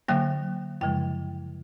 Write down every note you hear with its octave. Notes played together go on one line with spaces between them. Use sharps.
D3 F#3 A#3 G5
F#2 C#3 F3 G#3 G5